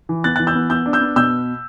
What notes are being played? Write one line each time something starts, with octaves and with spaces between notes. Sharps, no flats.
E3
B3 F#6 A6
E3 F#6 A6
E6 G6
B3
B3 E6 G6
D4
E6 G6
B3
B2 E6 G6